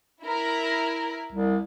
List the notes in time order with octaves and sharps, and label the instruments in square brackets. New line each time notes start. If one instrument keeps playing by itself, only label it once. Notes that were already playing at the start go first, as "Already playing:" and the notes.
[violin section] E4 A#4
[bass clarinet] C2